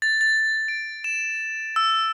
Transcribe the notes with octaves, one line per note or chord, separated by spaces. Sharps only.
A6
A6
D7
E7
E6